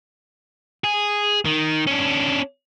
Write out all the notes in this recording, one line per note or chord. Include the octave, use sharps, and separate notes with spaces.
G#4
D#3
C#4 D4